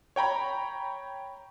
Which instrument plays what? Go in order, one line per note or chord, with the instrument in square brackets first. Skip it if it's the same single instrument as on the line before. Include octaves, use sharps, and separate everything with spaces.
[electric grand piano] C#5 G5 A#5 B5